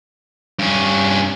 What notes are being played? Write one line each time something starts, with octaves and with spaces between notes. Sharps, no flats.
G2 C#4